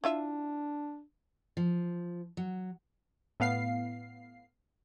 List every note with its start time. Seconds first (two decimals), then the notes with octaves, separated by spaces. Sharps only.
0.04 D4 E4 F4 E5
1.57 F3
2.37 F#3
3.40 A2 B3 F5 C7